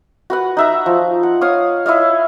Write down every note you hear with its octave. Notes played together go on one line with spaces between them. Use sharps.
F#4 B4 F#5
D#4 E5 A#5
F3
F#5
C#5 F5 D#6
E4 C#5 D#5 F5